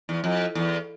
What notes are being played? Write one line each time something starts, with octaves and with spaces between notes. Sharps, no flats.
E2
F2
E2